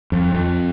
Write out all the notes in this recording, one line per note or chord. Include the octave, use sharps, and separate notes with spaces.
F2
F2